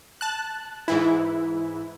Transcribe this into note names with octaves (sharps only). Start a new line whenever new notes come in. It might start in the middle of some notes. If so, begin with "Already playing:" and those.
A5 F#6
G#2 E3 E4